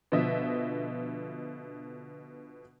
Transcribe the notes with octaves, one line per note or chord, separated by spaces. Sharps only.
B2 D3 F3 D#5 E5